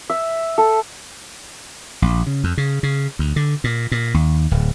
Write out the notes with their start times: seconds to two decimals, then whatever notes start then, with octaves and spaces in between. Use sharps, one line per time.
0.10 E5
0.58 A4
2.02 A#1
2.27 C#3
2.44 F2
2.57 C#3
2.83 C#3
3.19 D2
3.36 D3
3.64 A#2
3.92 A#2
4.14 D#2
4.51 D1